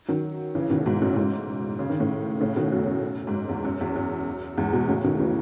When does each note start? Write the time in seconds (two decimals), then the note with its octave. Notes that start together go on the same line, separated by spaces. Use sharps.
0.08 D#3 F#3
0.55 C#3 E3
0.70 B2 D#3
0.78 C#3
0.86 G#2 B2
1.01 F#2 A2
1.13 C#3
1.16 G#2 B2
1.79 C#3
1.90 D#3
2.00 A2 C#3
2.41 A2 C#3
2.56 B2 D#3
2.72 F#2
3.27 G#2
3.34 F#2
3.49 E2
3.65 F#2
3.81 E2
3.96 F#2
4.58 E2 G#2
4.73 G#2 B2
4.89 A2 C#3
5.04 B2 D#3
5.20 C#3 E3